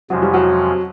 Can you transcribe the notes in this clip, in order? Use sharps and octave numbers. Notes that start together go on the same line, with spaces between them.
F2 C3 F3 F#3 G#3 C#4
G3
F#3